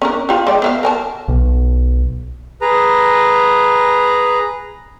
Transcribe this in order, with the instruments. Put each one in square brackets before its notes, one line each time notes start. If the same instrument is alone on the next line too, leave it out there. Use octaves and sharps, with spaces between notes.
[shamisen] C#4 D4 A#4
F4 G4
G#3 D5 G5
B3 E5 F5
A#4 G#5 A5
[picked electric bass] B1
[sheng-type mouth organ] G#4 B4 A#5